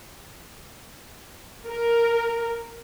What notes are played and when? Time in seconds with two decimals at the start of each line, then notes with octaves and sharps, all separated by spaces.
1.69 A#4